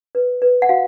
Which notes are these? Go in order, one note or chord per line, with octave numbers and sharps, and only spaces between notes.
B4
B4
F#5
F#4 F5